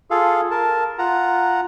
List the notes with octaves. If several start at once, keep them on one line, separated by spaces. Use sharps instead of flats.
F4 G#4 A4 F5
A#4 A5
F4 F#5 A#5